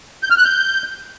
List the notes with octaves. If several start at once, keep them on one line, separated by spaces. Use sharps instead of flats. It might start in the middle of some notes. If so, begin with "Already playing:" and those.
G6
F6
F#6
G6